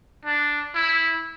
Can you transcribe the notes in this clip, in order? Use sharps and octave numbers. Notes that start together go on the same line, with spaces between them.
D4
E4